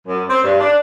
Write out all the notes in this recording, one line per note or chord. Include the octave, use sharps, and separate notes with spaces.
F#2
C4
G2
D4